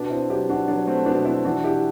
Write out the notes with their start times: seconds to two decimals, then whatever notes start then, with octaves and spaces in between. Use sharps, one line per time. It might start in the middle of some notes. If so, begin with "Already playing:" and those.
Already playing: B2 B3 D4
0.10 C4 E4
0.29 F#3 E4 G4
0.49 D4 F#4
0.68 F#3 B3 D4
0.87 A3 C4
1.06 B2 B3 D4
1.25 C4 E4
1.45 E3 D4 F#4
1.64 E4 G4